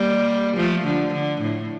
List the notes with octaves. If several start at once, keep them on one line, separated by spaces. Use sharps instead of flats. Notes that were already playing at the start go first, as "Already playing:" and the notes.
Already playing: G3 A#3
F3 A3
D3 F3
D3
A2